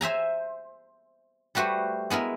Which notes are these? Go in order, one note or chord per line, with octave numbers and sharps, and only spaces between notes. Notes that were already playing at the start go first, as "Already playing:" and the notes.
C5 E5 G#5 A#5
G3 A3 F#4 B4 C5
G#3 B3 E4 A#4